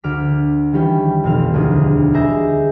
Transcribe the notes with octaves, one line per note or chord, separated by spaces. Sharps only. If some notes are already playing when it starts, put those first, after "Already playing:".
D2 D6 F6 B6
D#3 E3 G3 C#4 G4 B4
F1 B1 C4 F5 F6
E1 D2 D#6
G#4 B4 D#5 E5 A#5 G6